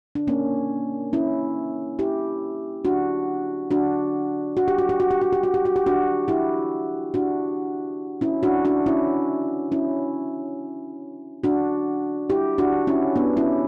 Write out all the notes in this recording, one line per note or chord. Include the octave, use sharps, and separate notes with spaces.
D4
A#3 C#4
C#4 E4
E4 G4
D4 F#4
D4 F#4
F#4
G4
F#4
G4
F#4
G4
F#4
G4
F#4
G4
F#4
G4
D4 F#4
E4 G4
D4 F#4
C#4 E4
D4 F#4
D4 F#4
C#4 E4
C#4 E4
D4 F#4
E4 G4
D4 F#4
C#4 E4
B3 D4
C#4 E4